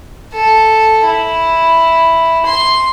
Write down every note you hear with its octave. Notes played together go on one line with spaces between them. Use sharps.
A4
E4
C6